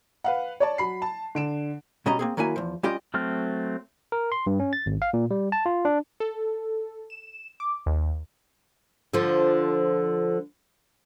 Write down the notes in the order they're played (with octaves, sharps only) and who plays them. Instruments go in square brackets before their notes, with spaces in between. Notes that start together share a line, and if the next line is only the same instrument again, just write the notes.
[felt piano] B4 F5 F#5
C#5 D5 A5
F#3 B5 C7
A5
D3 D7 E7
[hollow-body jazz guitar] B2 G3 C#4 D#5 A#5
A#3 C4 G#4
D#3 F#3 A#3 E4 G#5
E2 F3
G3 C#4 F4 G4 D#5 G5
[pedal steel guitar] F#3 A3 C4 F6
[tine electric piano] A#4
C6
G2
C#4
A6
G#1
F5
A#2
G3
A5
F4
D4
[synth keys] A4
E7
D6
D#2
[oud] D3 F3